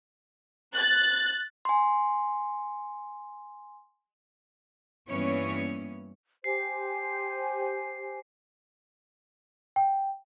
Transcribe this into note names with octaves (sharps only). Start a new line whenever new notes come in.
F#6 A6
G#5 C6
G2 E3 A#3 B3 C#4 C#5
G4 C5 G#5 C7
G5